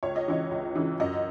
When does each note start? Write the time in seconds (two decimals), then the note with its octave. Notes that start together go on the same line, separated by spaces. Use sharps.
0.03 C#2 C#5
0.16 D#5
0.27 C#3 E3 C#5
0.51 C#2
0.75 C#3 E3
1.00 F#2 D#5